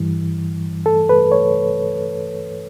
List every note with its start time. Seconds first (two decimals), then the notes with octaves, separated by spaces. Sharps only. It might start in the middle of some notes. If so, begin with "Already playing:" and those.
Already playing: G2 E3 G3
0.86 A4
1.09 B4
1.32 C#5